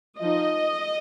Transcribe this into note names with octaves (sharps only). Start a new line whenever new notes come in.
F3 D#4 D#5